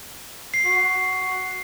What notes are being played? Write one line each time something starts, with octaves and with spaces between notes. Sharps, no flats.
C7
F#4